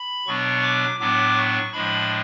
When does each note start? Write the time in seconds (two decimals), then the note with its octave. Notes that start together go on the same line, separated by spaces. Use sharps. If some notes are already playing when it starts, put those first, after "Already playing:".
Already playing: B5
0.27 B2 F#3 B3 D4 C#6
0.63 D6
1.00 A2 F#3 B3 D4 D6
1.36 C#6
1.73 A2 F3 G#3 D4 B5